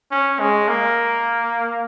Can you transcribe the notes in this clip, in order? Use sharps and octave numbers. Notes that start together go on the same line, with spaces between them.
C#4
G#3
A#3